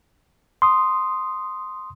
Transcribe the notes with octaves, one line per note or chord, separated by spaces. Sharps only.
C6 D#6